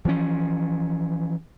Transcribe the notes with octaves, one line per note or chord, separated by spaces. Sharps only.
E3 F3 A#3 C#4